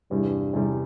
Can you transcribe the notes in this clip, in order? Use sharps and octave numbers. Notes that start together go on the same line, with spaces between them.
E2 G2 C3 G3
E2 C3 G3